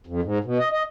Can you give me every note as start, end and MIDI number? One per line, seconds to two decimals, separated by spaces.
0.07 0.21 41
0.22 0.38 44
0.44 0.58 47
0.59 0.68 75
0.72 0.83 75